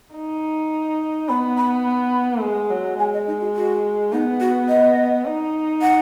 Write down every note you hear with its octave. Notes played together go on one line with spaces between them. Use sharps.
D#4
B3 B5
B5
B5
G#3
F#3
G#3 G#5
D#5
D#4
F#4
F#4
B3 D#4
F#4
D#5
D#4
F#5